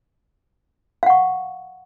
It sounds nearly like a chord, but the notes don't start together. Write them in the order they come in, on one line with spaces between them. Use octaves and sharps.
F5 F#5 C#6